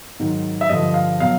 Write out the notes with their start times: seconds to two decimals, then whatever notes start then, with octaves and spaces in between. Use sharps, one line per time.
0.20 G#2 D#3 F#3
0.61 E5
0.69 G2 D3 F3 D#5
0.94 F5
1.20 B2 F#3 F5